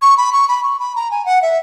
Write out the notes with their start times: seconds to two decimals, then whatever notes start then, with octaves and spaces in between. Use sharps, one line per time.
0.02 C#6
0.17 B5
0.32 C#6
0.48 B5
0.63 C#6
0.79 B5
0.95 A#5
1.11 G#5
1.25 F#5
1.42 E5